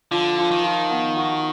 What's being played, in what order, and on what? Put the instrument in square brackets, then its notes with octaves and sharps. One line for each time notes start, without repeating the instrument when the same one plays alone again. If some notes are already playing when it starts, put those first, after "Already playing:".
[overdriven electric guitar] D3 [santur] F3
[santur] F3
[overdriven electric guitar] D#3
[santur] F3
B3
F#4